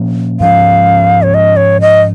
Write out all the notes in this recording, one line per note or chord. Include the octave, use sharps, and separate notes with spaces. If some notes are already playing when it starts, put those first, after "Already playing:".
Already playing: A#2 F3 A#3 C#4
G#2 F3 C#4 F5
C#5
D#5
C#5
D#5